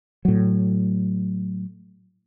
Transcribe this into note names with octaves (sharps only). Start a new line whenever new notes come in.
A2 F#3